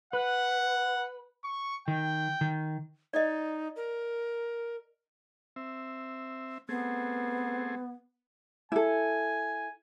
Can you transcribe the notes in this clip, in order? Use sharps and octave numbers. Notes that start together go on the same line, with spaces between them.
B4 F#5
C#6
D#3 G5
D#3
D#4 D5 D#5
A#4
C4 E5
A3 B3 C4 G#4
E4 A4 G#5